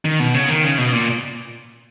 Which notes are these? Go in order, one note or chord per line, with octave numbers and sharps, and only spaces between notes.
D#3
B2
C#3
D#3
C#3
B2
A#2